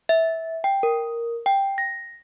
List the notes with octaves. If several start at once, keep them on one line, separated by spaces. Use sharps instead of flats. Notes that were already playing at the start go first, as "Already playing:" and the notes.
E5
G5
A#4
G5
A#6